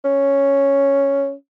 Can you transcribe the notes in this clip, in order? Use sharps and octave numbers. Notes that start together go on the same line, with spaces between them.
C#4